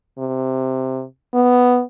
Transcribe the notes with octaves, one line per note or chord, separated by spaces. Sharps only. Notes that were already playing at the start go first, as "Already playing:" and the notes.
C3
B3